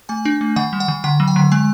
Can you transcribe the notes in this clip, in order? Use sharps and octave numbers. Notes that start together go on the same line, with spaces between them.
A3 G#5
D4
A3
D#3 F#5
G3
F#5
D#3
D3 F#5
F#3
G5
D3
G#3 G#5